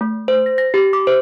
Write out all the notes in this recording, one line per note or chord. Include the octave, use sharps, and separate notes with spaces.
A3
C5
A#6
A#6
G4
D6
C5